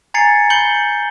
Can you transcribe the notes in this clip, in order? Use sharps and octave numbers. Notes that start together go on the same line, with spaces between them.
G#5 A#5 G#6 A6 C7 C#7
B5 G6 C#7 F#7 G7